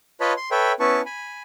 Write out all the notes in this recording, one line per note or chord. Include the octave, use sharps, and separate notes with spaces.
F4 B4 C#5 D#5 A5 B5
C6
A4 B4 C#5 E5 G5 B5
B3 C#4 E4 B4 A5 C#6
G#5 B5